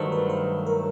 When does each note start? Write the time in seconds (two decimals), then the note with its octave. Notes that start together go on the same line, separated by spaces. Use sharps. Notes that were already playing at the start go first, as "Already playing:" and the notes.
Already playing: G2 D#3 F#3 A3 C5
0.12 B4
0.30 B4
0.66 A#4